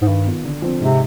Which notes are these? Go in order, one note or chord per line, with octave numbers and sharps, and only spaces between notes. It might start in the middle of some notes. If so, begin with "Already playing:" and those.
G#2
G2 D#3
B3 F4
D3
F3 C4
G#2 C3